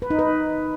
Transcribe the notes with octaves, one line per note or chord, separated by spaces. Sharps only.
B4
D#4
B4